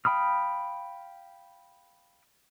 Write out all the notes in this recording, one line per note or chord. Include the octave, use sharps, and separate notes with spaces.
F5 G5 B5 D#6 F6